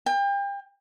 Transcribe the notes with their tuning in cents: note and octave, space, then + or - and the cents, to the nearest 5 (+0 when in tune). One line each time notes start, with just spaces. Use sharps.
G5 +35